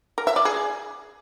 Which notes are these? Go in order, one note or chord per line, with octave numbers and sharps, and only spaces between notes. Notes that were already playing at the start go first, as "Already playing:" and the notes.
A#4
E5
D5
G#4